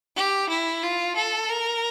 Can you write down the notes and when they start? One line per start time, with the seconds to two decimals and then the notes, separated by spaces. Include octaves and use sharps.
0.16 G4
0.50 E4
0.83 F4
1.16 A4
1.49 A#4